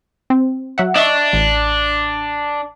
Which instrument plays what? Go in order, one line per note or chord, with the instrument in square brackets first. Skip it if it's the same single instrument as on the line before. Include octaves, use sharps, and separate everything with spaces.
[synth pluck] C4
F#3 E5 F#5
[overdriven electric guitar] D4 [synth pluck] D#5 E5 C#6
[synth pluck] A1